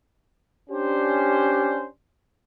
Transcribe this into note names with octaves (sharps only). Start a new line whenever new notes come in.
C#4 D4 G4 C5